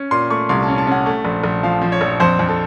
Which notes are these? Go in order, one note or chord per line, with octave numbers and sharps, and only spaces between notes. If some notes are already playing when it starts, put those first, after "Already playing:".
Already playing: C#4
A#2 C6
A3 C#6
C2 C6
A5
C#4
A5
C#4 F#5
A3
A#1
A#1
F3 F5
F3
C#5
A#1
F2 C5
F2
A4